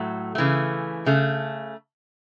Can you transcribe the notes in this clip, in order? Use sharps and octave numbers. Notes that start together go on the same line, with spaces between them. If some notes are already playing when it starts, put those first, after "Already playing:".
Already playing: A2 F#3 A3
C#3 E3 A3
C#3 A3